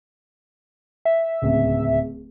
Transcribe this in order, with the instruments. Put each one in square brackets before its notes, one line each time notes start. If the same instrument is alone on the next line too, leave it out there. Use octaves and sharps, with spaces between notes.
[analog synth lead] E5
[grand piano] D1 C#2